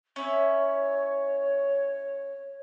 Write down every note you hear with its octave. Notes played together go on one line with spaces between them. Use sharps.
C#4 E4 C#5